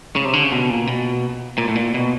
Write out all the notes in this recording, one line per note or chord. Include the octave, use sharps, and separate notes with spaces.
C#3
C3
D3
C#3
B2
A#2
B2
A#2
A2
A#2
B2